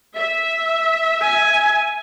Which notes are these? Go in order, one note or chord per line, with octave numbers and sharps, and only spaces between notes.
E5
G#5